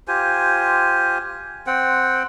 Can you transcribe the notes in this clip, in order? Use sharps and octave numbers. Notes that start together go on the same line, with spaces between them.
F4 G4 C5 G#5
C4 C5 F#5 G5